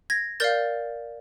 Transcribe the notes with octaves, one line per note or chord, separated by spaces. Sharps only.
G#6 A#6
A#4 D5 F5 G6 A6